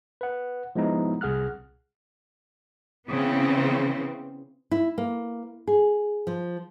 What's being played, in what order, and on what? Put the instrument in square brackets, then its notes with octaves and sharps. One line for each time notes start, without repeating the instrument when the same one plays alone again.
[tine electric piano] B4 F#5
F3 G#3 B3 D#4 E4
C2 G#4 F#5 F6 F#6
[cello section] C#3 E3 B3 C4
[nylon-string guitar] E4
A#3
G#4
F3